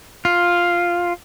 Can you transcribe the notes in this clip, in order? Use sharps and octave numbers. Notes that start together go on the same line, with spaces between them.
F4